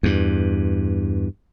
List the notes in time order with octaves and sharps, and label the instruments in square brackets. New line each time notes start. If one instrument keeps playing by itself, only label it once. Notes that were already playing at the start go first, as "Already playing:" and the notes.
[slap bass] E2 G2